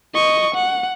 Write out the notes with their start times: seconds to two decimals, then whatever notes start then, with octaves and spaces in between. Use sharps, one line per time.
0.14 D#5 C#6
0.55 F#5